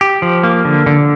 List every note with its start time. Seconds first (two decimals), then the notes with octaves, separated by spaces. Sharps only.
0.01 G4
0.22 F3
0.44 A#3
0.65 D3
0.86 D3